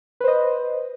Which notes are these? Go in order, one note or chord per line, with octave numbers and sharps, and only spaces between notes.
B4 C5 D#5